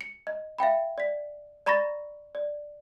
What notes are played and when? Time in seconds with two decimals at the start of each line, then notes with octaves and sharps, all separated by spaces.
0.01 C#7
0.27 D#5
0.58 E5 F5 G5 B5
0.98 D5 B6
1.66 D5 A#5 B5 C#6 A6 A#6
2.35 D5